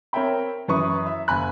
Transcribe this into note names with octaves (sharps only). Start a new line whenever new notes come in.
C4 A#4 C#5 E5 G5 B5
F#2 E3 B4 C#6 D#6
E5
F#1 G#5 B5 F#6